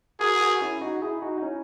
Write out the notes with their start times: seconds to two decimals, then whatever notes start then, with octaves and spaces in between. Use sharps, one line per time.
0.20 F#4 G#4 A#4
0.41 F#4 A#4
0.61 C#4 E4
0.81 D#4 F#4
1.02 E4 G#4
1.22 D#4 F#4
1.38 D#4
1.42 C#4 E4